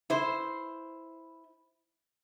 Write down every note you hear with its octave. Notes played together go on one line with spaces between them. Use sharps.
E4 C5